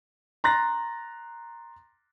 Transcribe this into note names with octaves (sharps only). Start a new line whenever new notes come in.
A#5 C6 F#6 A6 A#6